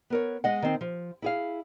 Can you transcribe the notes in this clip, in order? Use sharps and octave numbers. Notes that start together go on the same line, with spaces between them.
B3 A#4 C#5
G#3 D#5 F#5
D#3 C4
F3
E4 G#4 F5